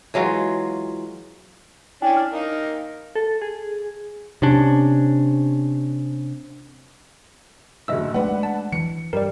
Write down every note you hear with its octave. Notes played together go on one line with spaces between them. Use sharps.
E3 F#3 G#3 F4
C#4 D4 E4 G5 G#5
F6
D#4 A#4 F5
A4
G#4
C3 C#4 D4
F#1 D2 D#5 E5 E6
G#3 A3 D4 B4 F#5
A5
E3 C#7
G2 G3 A#4 D5